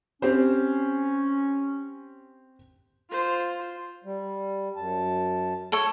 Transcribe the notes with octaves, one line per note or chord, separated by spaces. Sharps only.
C4 C#4 G4 C5
F4 C5
G3
F#2 A5
A4 C#5